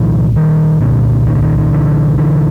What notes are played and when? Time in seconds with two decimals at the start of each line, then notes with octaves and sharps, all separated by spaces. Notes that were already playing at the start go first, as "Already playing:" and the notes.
Already playing: C2 A#2 D#3 F3
0.36 D#3
0.81 C2 A#2 D3
1.27 D#3
1.35 D3
1.42 D#3
1.58 D#3
1.73 D3 E3
2.18 D3 E3